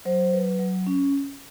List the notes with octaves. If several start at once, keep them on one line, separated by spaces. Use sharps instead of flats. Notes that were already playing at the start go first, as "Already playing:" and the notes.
F#3 C5
F#3 B4
F#3
C#4